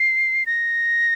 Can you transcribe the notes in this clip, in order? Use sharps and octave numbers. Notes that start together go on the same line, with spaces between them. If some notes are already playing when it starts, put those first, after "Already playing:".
Already playing: C7
A#6